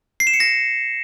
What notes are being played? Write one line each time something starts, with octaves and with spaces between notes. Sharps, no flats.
C7
E7
C#7
A#6